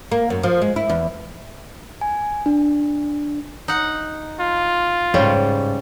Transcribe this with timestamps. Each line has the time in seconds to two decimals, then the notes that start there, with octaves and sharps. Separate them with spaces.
0.12 A#3
0.30 F#2
0.43 F3
0.62 G#3
0.76 E4
0.89 E2
2.01 G#5
2.46 D4
3.68 D#4 F#5
4.40 F4
5.14 G#2 C#3 G3 C#5